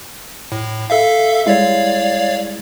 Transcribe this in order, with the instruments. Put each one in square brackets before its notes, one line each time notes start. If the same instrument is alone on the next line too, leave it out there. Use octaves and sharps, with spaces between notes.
[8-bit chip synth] A2
A4 E5 F5
[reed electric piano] G3 G#3 E4 [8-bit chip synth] C#5 D5 F5